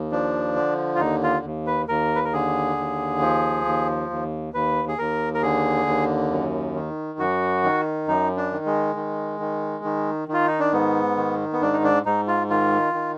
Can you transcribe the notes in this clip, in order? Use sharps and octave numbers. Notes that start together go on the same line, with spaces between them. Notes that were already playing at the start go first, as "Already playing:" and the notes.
Already playing: D#2
F3 D4
D3
F4
D#2 D#4
F4
D#2
B4
D#2 A#4
B4
A#4
D3 G#4
D#2
F3
D#2
D#2
D#2 B4
G#4
D#2 A#4
A#4
D3 G#4
D#2
F#2
D#3
F#2 F#4
D#3
F#2 D#4
D4
D#3
G#3
D#3
D#3
D#3
D#3 F4
D#4
D4
G#2 B3
D#3
B3
G#2 D4
D#4
D4
G#2 D#4
F4
D#3 F4
D#3